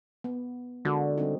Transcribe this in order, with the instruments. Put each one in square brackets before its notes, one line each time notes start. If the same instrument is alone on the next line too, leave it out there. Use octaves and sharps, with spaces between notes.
[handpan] B3
[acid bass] D3 [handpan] G#3 F#4 A#4
[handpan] G3 C4 D#4